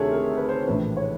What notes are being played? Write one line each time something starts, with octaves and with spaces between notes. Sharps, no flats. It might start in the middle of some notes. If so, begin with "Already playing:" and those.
Already playing: D2 C3 D#3 G#4 A4 C#5 E5
A#4
B4
C5
A#1 A2 E3 B4
C#5